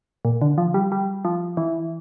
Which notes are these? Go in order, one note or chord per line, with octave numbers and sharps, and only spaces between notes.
A#2
D3
F3
G3
G3
F3
E3